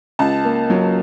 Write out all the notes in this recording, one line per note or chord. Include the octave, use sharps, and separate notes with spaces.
C#2 A5
A#3
F#3